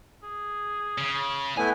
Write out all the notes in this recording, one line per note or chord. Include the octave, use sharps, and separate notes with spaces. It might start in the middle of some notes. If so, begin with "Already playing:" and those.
G#4
C#3
A3 B3 E4 G#5